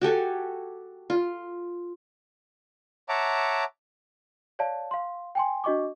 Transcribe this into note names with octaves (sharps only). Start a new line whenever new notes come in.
F#4 G4 A4 G#5
F4
C#5 E5 F#5 A5 A#5 D6
C#5 D5 F5 A5
F5 C6
G5 G#5 C6
D4 F#4 D#5 C#6 D6